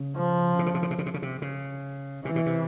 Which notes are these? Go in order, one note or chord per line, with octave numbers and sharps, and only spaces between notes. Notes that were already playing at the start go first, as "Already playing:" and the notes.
Already playing: C#3
F3
C3
C#3
C3
C#3
C3
C#3
C3
C#3
C3
C#3
C3 E3
B2
C3